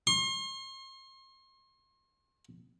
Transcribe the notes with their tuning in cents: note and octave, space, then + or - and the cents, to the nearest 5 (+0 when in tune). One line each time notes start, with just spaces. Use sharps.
C6 +40